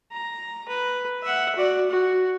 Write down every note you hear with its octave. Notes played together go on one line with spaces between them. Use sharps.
A#5
B4
E5 F#5
F#4 D5
F#4